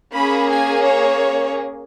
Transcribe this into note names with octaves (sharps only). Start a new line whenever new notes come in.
A#3 C#4 G#4 B5
G#5
C#5